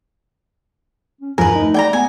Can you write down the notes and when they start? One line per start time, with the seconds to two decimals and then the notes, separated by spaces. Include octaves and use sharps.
1.21 C#4
1.38 E2 G2 F3 A#4 B4 G#5
1.56 A3 D#4
1.74 D5 G5 G#5 A#5
1.93 B3 G#5